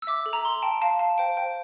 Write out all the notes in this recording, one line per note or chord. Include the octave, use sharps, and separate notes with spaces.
E6
E5 D6
A4
A#5
A4 C6
G5 A5
F5 A5
F5 A5
C5 G5
C5 G5